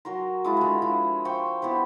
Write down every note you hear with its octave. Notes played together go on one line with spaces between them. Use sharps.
F#3 F#4 A#4 C6
G#3 E4 F4
D3 G#3
F3 E4
C5 F5 G5 C#6
B3 E4 G4 C5